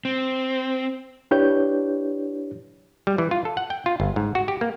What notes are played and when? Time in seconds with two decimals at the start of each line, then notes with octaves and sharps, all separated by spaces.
0.05 C4
1.31 D4 E4 G4 B4 C#5 G6
3.07 G3
3.18 E3
3.31 F4
3.45 A4
3.57 F#5
3.70 G5
3.86 F4
4.00 G1
4.16 G#2
4.35 F#4
4.48 G4
4.61 A#3